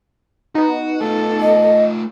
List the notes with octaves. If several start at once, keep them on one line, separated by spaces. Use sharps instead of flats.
B3 D#4 F#4
A3 F4 A4
D#5